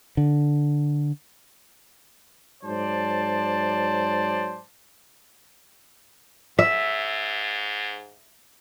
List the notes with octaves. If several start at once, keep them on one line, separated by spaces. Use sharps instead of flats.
D3
G#2 F#3 C5 D5 A5
G#2 E5